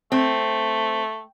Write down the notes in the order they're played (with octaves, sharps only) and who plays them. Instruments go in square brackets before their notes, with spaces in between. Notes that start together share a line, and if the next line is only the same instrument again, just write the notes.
[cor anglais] A3 [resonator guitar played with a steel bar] C4